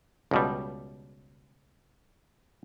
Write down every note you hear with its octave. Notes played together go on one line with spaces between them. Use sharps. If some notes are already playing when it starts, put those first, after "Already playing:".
C#2 B2 G3